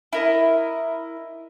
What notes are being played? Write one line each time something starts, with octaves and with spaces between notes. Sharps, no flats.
E4 A#4 D#5